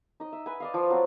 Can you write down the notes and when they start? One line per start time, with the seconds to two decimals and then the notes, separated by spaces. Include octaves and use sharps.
0.20 D#4 D#5
0.33 E5
0.46 B4 G#5
0.60 D5 D#5 F5
0.74 F3
0.90 F#3 C4